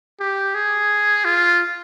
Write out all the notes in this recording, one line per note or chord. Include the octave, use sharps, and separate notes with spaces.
G4
G#4
F4